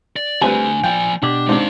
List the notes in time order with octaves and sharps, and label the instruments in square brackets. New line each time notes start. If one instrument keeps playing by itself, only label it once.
[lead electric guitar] D5
[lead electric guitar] D3 A3 [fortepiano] G3 C4 B4 [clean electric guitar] G#5
[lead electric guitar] F3 D5 [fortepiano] G5
[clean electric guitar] B2 G4 D5 [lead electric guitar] D4
[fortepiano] G#2 C4 D4 [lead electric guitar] D#4 F5